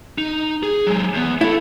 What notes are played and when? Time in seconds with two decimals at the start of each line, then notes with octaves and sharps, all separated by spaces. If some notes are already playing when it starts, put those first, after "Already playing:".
0.18 D#4
0.63 G#4
0.87 F#3 G#3
1.14 E2 B3
1.41 A3 E4 A4